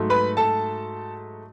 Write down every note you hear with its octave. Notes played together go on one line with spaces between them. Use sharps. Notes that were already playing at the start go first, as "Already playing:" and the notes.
Already playing: G#2 F#3 A3
B4 B5
A4 A5